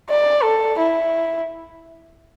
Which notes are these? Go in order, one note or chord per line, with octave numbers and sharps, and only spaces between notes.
D5
A4
E4